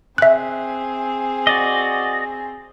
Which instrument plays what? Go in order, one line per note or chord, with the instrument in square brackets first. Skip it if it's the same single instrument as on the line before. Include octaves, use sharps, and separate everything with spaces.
[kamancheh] C4 G#4 [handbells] E5 F#6
[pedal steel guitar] F#4 D5 D#5